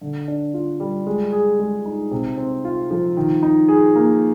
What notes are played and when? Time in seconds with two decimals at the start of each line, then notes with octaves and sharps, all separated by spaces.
0.01 D3
0.28 D4
0.54 F4
0.80 G3
1.07 G#3
1.32 G#4
1.60 G#3
1.85 D#4
2.11 C3
2.38 C4
2.65 F4
2.91 F3
3.17 D#3
3.43 D#4
3.68 G#4
3.96 A#3